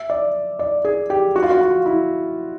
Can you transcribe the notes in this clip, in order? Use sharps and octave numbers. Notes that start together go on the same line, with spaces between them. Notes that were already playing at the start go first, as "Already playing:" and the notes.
Already playing: E5
D5
D5
G#4
G4
F#4
F4
F#4
F4
E4